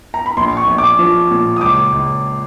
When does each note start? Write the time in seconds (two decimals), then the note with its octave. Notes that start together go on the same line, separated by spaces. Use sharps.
0.14 A#5
0.26 B5
0.37 A#1 C6
0.57 C#6
0.67 A#1
0.78 D6
0.99 F3
1.31 A#2
1.56 D#6
1.61 C#2 D6
1.92 C#2